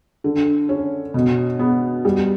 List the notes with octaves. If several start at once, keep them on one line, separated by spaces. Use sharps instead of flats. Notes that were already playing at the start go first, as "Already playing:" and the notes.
D3
C#4
B2
B3
G3